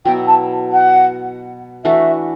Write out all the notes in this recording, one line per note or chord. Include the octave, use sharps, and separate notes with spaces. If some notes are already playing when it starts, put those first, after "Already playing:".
B2 F#3 B3 E4 G5
A5
F#5
E3 A3 D4 F#4 E5